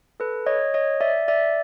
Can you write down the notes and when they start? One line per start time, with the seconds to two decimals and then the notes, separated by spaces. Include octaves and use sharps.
0.20 A4 B4
0.46 C#5 D#5
0.74 C#5 D#5
1.01 D5 E5
1.28 D5 E5